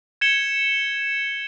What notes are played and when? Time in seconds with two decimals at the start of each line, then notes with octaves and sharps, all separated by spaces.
0.21 G#6 C#7 E7 G7